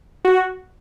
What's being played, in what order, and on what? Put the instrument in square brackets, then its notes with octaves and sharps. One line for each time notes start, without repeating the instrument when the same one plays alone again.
[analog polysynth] F#4